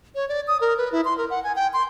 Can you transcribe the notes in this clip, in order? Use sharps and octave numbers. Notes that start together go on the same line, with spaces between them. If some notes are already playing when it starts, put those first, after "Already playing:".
C#5
D5
D#6
A#4
B4
E4
C6
A#4
F#5
G#5
G5
C6